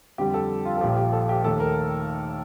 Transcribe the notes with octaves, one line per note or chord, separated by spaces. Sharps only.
F2 D3 G3 C4 G4
A4
F4
A4
A#1 A#2 F3 G4
G4
A4
G4
D#2 D#3 A3 A4
A#4